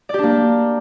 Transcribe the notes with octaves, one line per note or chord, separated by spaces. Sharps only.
A#3 D4 G4 D5